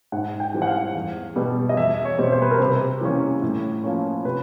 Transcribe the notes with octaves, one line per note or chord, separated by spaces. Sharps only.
G#2 F#5
G5
E3 G3 C4
F#5
F5
E2
B2 G3 B3
D#5
E2 E5
C#5
B2 G3 C4
C5
B4
A#4
C3 B4
E3 G3 A#3 C#4
A2
F3 A#3 C#4
C3 B4